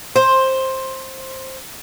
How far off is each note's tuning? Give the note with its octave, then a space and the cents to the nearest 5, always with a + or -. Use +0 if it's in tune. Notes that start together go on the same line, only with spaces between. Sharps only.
C5 +10